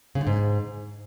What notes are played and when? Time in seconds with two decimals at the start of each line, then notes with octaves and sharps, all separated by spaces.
0.15 C#3
0.21 D3
0.27 G#2